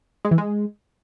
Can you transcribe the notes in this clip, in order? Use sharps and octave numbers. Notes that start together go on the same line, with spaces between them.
G#3
E3
G#3